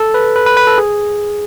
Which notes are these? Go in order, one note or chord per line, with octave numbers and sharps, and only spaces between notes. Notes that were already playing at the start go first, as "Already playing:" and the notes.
Already playing: A4
B4
B4
B4
B4
A4
G#4